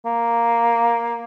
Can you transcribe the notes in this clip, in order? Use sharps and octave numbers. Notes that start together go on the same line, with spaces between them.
A#3